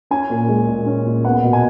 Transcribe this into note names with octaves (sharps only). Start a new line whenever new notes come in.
C#4 G#5
A#2
G#3
A#2
C#4
A#2
B3 F#5
B2
G#5